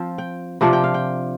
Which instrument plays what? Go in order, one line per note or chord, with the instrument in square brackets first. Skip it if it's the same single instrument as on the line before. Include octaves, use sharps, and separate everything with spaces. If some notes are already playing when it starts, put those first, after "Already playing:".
Already playing: [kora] F3 C4 F4
G5
C3 F3 D4 F4
G5
F5
G5